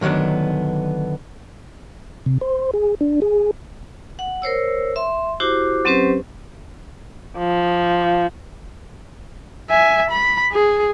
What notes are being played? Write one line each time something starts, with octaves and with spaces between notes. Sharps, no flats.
D3 D#3 F#3 B3 D4
C3
C5
G#4
D4
G#4
F#5
A#4 C5 C#5 E6
E5 C6
E4 F#4 G4 C5 D6
F#3 C4 C#4 G4 B4 C5
F3
E5 G#5
B5
G#4